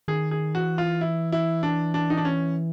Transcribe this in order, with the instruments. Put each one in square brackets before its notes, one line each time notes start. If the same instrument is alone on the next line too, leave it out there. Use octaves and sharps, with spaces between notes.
[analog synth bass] D#3 [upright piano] G#4
[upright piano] G#4
[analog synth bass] E3 [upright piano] F#4
[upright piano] F4
E4
E4
D4
D4
D#4
D4
C#4